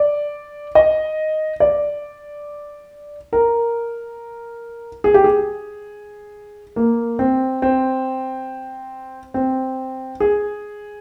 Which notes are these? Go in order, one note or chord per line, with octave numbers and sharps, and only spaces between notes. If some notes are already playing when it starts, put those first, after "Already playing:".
Already playing: D5
D#5
D5
A#4
G#4
G4
G#4
A#3
C4
C4
C4
G#4